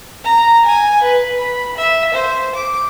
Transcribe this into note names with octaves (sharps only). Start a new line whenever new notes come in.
A#5
G#5
B4
B5
E5
C5
D6